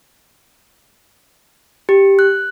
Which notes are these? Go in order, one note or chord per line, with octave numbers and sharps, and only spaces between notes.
G4
F#6